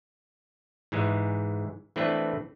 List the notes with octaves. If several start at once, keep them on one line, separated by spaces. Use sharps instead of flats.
G#2 E3 G#3
E3 A3 C4 D4 B4